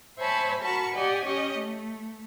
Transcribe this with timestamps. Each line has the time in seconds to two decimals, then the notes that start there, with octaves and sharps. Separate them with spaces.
0.19 C5 C#5 E5 G#5 A5 B5
0.62 F#4 A#4 A5 B5 C#6
0.94 G4 D5 D#5 F#5 G#5
1.25 C#4 G4 C#5 D#5
1.58 A3